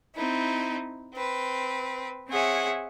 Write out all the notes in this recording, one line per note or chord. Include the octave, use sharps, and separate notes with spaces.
C4 D#4 E4
C4 B4
C4 G#4 C#5 E5 F#5 G#5